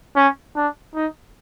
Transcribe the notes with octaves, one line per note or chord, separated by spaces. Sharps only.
C#4
D4
D#4